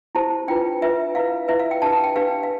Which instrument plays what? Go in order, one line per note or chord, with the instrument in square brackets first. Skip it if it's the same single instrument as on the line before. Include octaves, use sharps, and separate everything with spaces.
[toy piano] E4 G4 C5 A5
D4 F4 B4 G5
D4 F4 B4 E5
E4 B4 F5
E4 B4 E5
F5
G5
D4 G4 B4 A5
A5
G5
D4 G4 B4 F5
F5